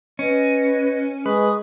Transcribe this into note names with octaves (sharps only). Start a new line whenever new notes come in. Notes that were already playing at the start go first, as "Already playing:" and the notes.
C#4 B4 D#5
G#3 B4 C#6 D#6